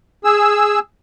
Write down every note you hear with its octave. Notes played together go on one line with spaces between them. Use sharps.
G#4 E6